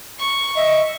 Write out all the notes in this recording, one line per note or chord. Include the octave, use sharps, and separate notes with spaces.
C#6
D#5 E5